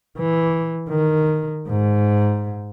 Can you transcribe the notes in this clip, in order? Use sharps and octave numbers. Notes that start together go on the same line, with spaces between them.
E3
D#3
G#2